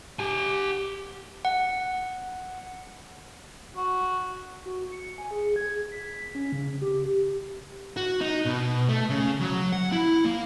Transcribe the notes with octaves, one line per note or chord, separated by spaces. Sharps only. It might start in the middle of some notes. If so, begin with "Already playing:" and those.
G4 G#5
F#5
F#4
F#4
C#7
G#5
G#4
G#6
B6
C#4
C#3
G4
F#4
D#4
B2
A3
C#3
F#3
F#5
E4
A#3